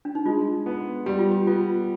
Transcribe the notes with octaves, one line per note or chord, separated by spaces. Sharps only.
D4
D#4
G#3 F4
B3
G3 G4
F4
G4
B3 F4